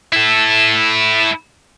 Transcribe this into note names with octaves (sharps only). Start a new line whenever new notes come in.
E4 A4